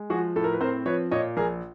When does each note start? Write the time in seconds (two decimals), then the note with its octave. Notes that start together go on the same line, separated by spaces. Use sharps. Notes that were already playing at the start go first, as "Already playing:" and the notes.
Already playing: G#3
0.10 F3 F#4 G#4
0.36 A2 A4
0.44 A#4
0.53 B4
0.60 C4 A#4 C5
0.86 F3 B4 C#5
1.11 A#2 C#5 D#5
1.37 A#1 G#4 A#4